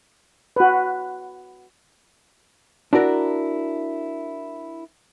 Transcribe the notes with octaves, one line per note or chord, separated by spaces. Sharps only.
F#4 B4
D4 E4 F#4 A#4